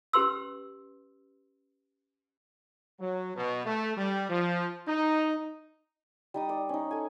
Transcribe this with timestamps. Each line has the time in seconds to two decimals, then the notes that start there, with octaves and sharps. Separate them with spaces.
0.13 C#4 G4 B4 C6 E6
3.00 F#3
3.36 B2
3.65 A3
3.97 G3
4.29 F3
4.88 D#4
6.34 G3 D#4 D#6
6.49 D5
6.69 C#4 D#4
6.91 A4 G#5